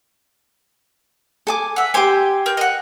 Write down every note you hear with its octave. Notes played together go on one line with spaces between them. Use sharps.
A4 G#5 D6
E5 F#5
G4 C5 G#5 D6
A#4 G6
D#5 F#5